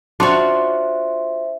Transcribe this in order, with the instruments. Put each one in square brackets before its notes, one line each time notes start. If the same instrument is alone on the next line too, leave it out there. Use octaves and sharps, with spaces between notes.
[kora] D4 C#5 [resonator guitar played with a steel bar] F4 F#4 [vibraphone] C5 E5